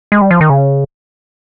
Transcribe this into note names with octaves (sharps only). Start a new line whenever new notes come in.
G#3
G3
F3
D#3
C#3